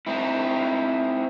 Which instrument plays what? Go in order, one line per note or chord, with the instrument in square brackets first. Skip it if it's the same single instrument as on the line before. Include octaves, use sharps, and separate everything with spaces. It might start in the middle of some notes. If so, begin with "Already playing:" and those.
[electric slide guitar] C4 D#4 E4